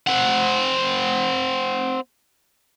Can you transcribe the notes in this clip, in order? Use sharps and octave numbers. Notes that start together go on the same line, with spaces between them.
C4 F#5